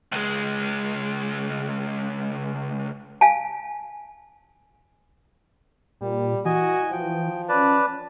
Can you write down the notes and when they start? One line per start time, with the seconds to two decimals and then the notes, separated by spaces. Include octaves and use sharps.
0.12 C#2 G#3
3.21 F5 G#5 A5
6.01 A#2 G3
6.45 E3 F#4 D#5 G#5
6.92 F3 G5
7.49 C#4 B4 D5 A5